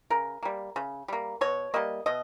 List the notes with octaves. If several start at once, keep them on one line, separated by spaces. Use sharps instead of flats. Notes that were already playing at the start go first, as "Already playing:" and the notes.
C#3 A#4
G3 A#3
C#3
G3 A#3
B2 C#5
G3 A#3 D#5
B2 D#5